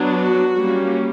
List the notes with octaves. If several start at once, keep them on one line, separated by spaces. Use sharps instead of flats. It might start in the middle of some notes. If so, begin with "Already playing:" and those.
Already playing: F#3 B3 D4
F#4
G3 A#3 C#4